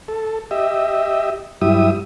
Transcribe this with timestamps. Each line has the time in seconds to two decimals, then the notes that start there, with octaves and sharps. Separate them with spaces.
0.08 A4
0.51 G4 D#5 E5
1.62 G2 F#3 E4 G4 E5 D#6